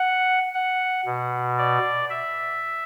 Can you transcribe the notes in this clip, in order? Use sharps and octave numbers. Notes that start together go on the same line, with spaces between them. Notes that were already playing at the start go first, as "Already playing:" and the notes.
Already playing: F#5
F#5
B2
D5
E5